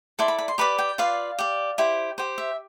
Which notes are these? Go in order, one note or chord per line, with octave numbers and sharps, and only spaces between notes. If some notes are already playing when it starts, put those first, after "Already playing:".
E4 A4 D5 C6
B5
B5
C6
G4 B4 D5 B5
G5
F4 B4 D5 F5
G4 D5
E4 G4 C5
G4 C5
E5